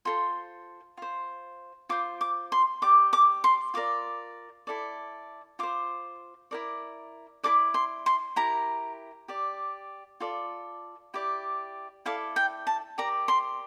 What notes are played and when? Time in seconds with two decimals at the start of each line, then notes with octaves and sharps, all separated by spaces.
0.05 F4 A4 C5 C6
0.97 F4 C5
1.89 F4 C5 D6
2.21 D6
2.52 C6
2.82 G4 D5 D6
3.13 D6
3.44 C6
3.74 F4 A#4 D5 D6
4.67 E4 A4 D5
5.59 F4 C5 D6
6.51 E4 A#4 D5
7.44 E4 A4 D5 D6
7.74 C6
8.06 C6
8.36 E4 G4 A#4 A#5
9.28 G4 D5
10.20 F4 A4 D5
11.14 E4 G4 D5
12.05 E4 A4 D5 F5
12.36 G5
12.67 A5
12.98 G4 A#4 D5 A#5
13.28 C6